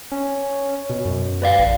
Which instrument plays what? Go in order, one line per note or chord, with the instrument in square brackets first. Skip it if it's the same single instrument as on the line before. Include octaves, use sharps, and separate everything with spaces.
[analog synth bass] C#4
B2
F#2
[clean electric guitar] B4 D5 F5
[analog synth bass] A1